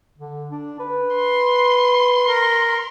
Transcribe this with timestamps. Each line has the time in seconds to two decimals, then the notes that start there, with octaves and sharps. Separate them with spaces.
0.19 D3
0.51 D4
0.80 B4
1.16 C6
2.27 A#4